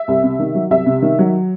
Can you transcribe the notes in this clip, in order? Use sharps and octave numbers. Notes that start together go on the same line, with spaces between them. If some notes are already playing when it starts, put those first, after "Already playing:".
Already playing: E5
C2
C3
D#3
F#3
C2 E5
C3
D#3
F#3